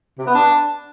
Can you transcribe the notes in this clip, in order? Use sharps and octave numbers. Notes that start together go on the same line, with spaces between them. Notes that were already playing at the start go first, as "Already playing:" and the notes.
C3
B3
D4